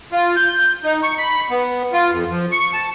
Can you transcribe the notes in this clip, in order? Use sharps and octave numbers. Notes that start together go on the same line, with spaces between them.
F4
G6
D#4
C#6
B5
B3
F4
F2
F3
C#6
A5